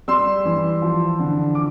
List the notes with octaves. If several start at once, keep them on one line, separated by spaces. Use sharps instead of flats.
G3 C6 E6
E3
F3
D3
D6